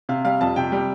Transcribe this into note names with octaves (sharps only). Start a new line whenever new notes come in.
C3 F5
G3 F5
F2 A5
C3 G5
G3